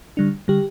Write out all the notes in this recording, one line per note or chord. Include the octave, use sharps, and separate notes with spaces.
D3 G3 D4
D3 G3 G4